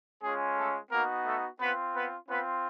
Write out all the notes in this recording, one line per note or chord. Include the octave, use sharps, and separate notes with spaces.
G#3 C#4 F4 G#4
A3 A4
A#3 B3 D#4 F#4 A#4
A3 A4
B3 C4 F4 B4
B3 B4
B3 C4 F4 B4